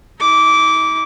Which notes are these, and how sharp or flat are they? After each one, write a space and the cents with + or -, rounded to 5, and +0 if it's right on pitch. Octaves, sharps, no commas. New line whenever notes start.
E4 -45 D6 -15